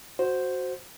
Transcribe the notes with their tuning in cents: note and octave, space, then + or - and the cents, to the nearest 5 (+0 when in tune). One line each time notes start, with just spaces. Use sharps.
F#4 +0 C5 +0